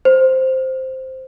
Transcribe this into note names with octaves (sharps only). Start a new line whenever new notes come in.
C5